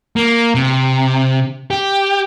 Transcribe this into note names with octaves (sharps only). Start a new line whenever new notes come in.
A#3
C3
G4